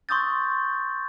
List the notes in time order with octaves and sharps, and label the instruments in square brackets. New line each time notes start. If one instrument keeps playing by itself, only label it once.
[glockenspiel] C6 C#6 D#6 E6 G6 A6